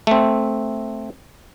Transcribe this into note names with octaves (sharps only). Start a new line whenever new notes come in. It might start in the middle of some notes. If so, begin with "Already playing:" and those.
A3 C4